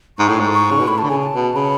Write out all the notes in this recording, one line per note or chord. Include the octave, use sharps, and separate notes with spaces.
G#2 C#6
A2
G#2
C#6
C#3
B2
A2 B5
D3 A5
C#3 G#5
A5
B2
C#3 B5